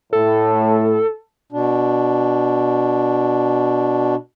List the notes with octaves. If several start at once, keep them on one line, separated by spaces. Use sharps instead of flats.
A2 A4
B2 D4